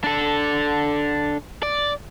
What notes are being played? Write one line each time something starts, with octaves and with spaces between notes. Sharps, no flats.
D4 A4
D5